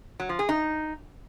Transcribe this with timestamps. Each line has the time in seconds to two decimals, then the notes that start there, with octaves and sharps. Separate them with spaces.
0.20 F#3
0.29 F3
0.39 G#4
0.49 D#4